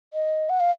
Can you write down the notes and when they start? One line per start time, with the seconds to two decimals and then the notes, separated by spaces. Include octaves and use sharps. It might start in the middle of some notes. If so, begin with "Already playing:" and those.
0.13 D#5
0.49 F#5
0.60 F5